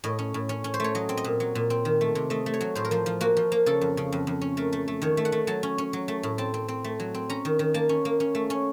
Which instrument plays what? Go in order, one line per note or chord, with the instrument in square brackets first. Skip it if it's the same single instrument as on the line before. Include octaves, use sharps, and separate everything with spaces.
[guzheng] A2 D#5
C#4
A2
C#4
C#4
C5
A3 C#5
F#3 D#5
C4
D#5
A#2
F#3
A#2
C4
D#3
A3
C3
A3 D#5
A3
C#5
F#3
A2 C5
A#4
F3 C5
F3
A#3 F#4
F3
A#3
C#3 A4
F2
C#3
F2
F2
C#4
A3 A#4
A3
A3
D#3 C#5
A3
F#5
A3
F#3 A5
C#4
C#4
F#3
A3
A2
C4 A5
C4
C4
A3
F#3
C4
C#4 A#5
D#3
D#3
A#3 A5
C#4
A#3
C#4
A3
C#4